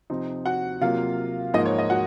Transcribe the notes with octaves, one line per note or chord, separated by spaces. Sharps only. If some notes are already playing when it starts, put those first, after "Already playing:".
C3 F3 C4 D#4
F#4 F#5
C3 F#3 A#3 F4 F5
G#2 F3 A#3 D#4 D#5
C#5
D#5
F#4 F#5